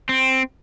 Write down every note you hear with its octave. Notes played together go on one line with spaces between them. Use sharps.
C4